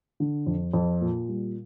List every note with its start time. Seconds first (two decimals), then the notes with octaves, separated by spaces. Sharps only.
0.20 D3
0.46 F2
0.73 F2
1.01 A#2
1.28 G3